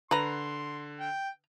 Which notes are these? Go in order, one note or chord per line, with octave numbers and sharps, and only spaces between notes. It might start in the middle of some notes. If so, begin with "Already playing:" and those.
D3 B4 A#5 C6
G5